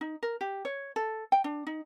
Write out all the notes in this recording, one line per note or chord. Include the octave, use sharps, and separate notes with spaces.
D#4
A#4
G4
C#5
A4
G5
D4
D#4